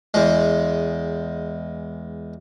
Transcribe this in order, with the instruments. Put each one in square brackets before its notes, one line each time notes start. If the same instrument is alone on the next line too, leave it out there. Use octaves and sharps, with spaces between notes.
[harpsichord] E2 G#3